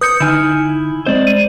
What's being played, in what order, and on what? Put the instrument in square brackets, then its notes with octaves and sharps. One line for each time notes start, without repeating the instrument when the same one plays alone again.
[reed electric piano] B4 [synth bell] D#6 G6 C#7
[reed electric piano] D3 D#4 [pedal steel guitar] E4 G#5 F6
[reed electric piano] G#3 C4 D#5 [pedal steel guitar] C5 D5
[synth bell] D#7